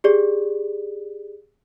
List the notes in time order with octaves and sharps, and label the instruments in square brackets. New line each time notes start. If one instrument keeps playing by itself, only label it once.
[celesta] G4 G#4 D5